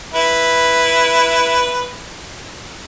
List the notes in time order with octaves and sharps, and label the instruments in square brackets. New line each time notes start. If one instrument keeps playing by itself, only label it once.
[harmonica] E4 B4